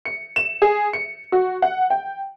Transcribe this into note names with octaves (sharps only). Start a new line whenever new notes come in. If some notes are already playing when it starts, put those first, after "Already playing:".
C#7
E7
G#4
C#7
F#4
F#5
G5